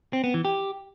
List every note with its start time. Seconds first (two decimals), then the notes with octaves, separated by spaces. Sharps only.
0.13 C4
0.24 B3
0.34 E3
0.45 G4